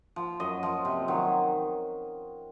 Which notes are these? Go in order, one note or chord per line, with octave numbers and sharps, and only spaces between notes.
F3
F#2 D#5
F3
C3
D#3 F#3